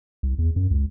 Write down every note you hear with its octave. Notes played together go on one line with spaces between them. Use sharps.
C2
E2
F#2
C#2